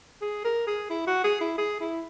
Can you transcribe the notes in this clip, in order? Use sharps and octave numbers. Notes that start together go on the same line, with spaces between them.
G#4
A#4
G#4
E4
F#4
G#4
E4
G#4
E4